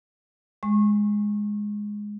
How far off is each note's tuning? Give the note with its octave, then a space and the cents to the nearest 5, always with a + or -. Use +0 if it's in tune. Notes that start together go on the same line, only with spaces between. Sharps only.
G#3 +0 C#6 -30